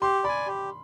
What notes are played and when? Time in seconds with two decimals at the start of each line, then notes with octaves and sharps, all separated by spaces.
0.02 G4 C6
0.24 D5 G#5 B5
0.47 G4